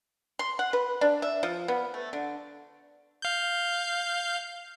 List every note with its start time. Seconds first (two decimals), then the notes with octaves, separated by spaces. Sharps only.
0.39 C6
0.59 F#5
0.73 B4
1.01 D4
1.22 E5
1.43 F3
1.68 B3
1.94 A3
2.13 D3
3.22 F5 G6